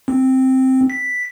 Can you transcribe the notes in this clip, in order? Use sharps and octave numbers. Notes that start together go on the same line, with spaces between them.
C4
B6